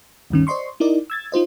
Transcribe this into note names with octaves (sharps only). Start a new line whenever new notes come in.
D2 G2 D#3 C#4
C5 D5 D#5 C6 C#6
D#4 E4 A#4 D5 D#5
E6 G#6 A6
D#4 F4 C5 D#5